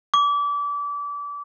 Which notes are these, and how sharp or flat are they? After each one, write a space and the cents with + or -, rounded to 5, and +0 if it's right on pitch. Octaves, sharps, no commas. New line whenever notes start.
D6 -30